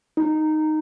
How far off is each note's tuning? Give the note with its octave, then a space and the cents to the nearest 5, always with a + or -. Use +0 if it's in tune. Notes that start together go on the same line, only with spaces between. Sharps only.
D#4 -5